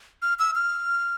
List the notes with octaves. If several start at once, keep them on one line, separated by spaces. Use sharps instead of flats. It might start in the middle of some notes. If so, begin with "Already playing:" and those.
F6
E6
F6